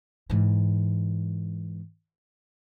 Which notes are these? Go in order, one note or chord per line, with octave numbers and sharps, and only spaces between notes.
G#2 E3